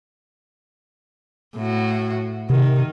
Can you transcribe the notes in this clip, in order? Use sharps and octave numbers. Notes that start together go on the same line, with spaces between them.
A2 F#4
C3 D#3